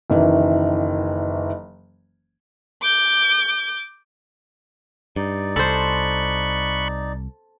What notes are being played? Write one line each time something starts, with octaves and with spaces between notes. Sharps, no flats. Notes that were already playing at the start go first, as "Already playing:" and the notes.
F#1 D#3 E3
D6 G6
G2 D#4 D5
C2 A4 C5 B5 C#6 F#6